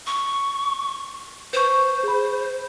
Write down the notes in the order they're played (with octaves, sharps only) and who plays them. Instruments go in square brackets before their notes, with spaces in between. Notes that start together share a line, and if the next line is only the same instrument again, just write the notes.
[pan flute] C#6
[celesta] B4 C#6 [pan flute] C5
[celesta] G#4 B5